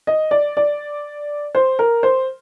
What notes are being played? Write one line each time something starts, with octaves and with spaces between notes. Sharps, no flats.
D#5
D5
D5
C5
A#4
C5